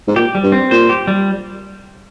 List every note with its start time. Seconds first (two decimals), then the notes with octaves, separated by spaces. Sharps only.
0.08 G#2
0.16 A#2 G4
0.35 G3
0.43 G2
0.52 C4
0.71 A#2 C5
0.89 G4
1.08 G3